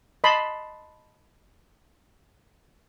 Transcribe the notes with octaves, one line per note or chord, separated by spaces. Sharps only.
D#5 A5 B5 C6